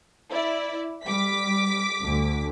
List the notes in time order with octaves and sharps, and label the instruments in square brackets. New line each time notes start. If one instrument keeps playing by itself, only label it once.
[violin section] E4 D5
[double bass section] G3 [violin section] D6 B6
[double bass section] D2 D3